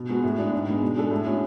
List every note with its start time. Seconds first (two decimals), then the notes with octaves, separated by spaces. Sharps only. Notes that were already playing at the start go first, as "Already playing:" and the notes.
Already playing: B2
0.09 G#3 B3 F#4
0.23 A2
0.38 G#3 D4 G#4
0.52 G#2
0.67 G#3 B3
0.83 B2
0.96 G#3 D4 A4
1.11 A2
1.26 G#3 C#4 F#4